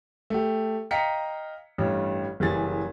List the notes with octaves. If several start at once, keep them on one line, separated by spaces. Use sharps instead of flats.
A3 G4
D#5 F5 G5 A#5 B6 C#7
A1 G2 G3
F#1 E3 G3 G#4 A6